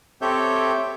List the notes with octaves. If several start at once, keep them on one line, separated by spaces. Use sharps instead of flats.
C4 G4 A4 C#5 E5 G6